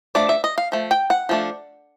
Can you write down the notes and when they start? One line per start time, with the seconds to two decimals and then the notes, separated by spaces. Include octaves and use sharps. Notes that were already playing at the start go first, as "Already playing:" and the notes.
0.15 F3 A3 D4 D5
0.29 E5
0.44 D#5
0.58 F5
0.72 F3 A3
0.91 G5
1.10 F#5
1.29 F3 A3 D4